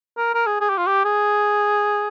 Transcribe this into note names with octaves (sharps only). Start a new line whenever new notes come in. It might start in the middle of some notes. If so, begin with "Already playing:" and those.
A#4
A#4
G#4
G#4
G4
F4
G4
G#4